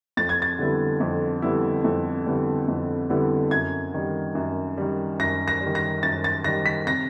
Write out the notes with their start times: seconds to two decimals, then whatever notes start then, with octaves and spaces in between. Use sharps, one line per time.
0.17 F2 A6
0.29 G#6
0.42 A6
0.59 D3 G3 B3 E4
1.00 F2
1.42 D3 G3 B3 E4
1.84 F2
2.26 D3 G3 B3 E4
2.68 F2
3.10 D3 G3 B3 E4
3.51 F#2 G#6
3.94 D#3 G3
4.35 F#2
4.78 D#3 G3
5.19 F#2 A#6
5.48 A#6
5.61 G3
5.66 D#3
5.75 A#6
6.03 F#2 A6
6.24 A6
6.44 D#3 G3 A#6
6.66 B6
6.86 C3 A#6